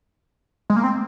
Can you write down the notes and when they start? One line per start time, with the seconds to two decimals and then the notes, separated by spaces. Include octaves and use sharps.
0.70 G#3
0.76 A#3
0.84 C4